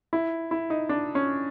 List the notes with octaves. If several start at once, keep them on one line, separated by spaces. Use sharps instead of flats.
E4
E4
D#4
D4
C#4